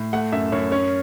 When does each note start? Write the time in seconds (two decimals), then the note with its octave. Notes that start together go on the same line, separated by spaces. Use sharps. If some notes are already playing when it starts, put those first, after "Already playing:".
Already playing: A2
0.13 A3 F#5
0.32 F#2 E5
0.52 F#2 C#5
0.71 C#4 C#5